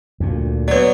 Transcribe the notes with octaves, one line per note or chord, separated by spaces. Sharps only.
D2 A#2
F#3 B3 C#5 D5